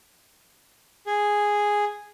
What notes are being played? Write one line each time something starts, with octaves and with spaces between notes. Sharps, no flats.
G#4